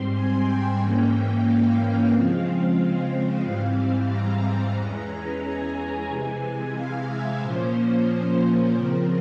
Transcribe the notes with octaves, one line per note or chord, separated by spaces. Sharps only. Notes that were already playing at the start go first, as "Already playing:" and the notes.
Already playing: G#2 G3 C4 C6
G#5
G5
G#2 E3 A#3 C#4
F5
C#3 F3 G#3 C4
G#2 E3 G3 C4
A#5
E2 E3 G#3 C#4
G#5
C3 E3 G#3
F5
E5
A#2 F3 A#3 C#4 C5
C#3 F3 C4 A#4